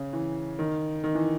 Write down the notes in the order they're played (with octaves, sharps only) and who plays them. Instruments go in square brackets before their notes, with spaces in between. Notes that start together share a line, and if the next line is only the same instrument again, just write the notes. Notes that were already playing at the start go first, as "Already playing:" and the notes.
Already playing: [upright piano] C#3
E3
D#3
D#3
E3